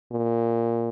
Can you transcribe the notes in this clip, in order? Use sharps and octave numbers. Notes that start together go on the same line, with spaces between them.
A#2